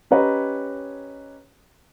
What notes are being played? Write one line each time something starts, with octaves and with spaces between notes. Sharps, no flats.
C#4 G4 B4 C#5 D#5 A#5